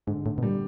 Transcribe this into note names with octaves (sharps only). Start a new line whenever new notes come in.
G#2 D3
A2
B2
A#2 G3